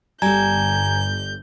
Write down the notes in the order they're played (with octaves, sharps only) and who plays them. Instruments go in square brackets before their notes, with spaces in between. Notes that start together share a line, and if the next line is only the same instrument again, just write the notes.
[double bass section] G1 [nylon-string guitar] G3 A4 [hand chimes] G#5 A#5 G#6 [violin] G6